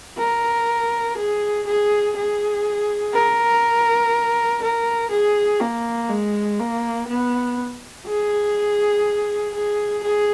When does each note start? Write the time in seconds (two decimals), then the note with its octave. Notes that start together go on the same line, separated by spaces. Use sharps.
0.18 A#4
1.17 G#4
1.66 G#4
2.16 G#4
3.13 A#4
4.62 A#4
5.10 G#4
5.60 A#3
6.09 G#3
6.59 A#3
7.07 B3
8.07 G#4
9.54 G#4
10.03 G#4